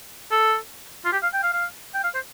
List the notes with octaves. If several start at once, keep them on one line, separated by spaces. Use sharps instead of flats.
A4
F4
G4
F5
G5
F5
F5
G5
F5
C5